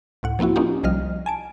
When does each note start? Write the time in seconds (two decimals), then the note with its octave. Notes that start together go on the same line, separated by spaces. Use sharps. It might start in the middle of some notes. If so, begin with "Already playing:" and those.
0.23 C#2 A2 F#5
0.39 F3 A#3 C4 E4 F#4
0.56 A#3 C#4 D#4 F4 G4
0.83 C2 F3 G3 D#5 F6
1.26 G#5 A5 D7